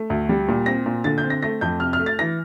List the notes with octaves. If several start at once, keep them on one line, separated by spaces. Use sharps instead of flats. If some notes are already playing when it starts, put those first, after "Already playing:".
Already playing: A3
D2
G3
A#2
C4 A#6
A#2
D3 A6
G6
C4
A#6
A3 A#6
F2 G6
C3 F6
F6
A3
A6
E3 A#6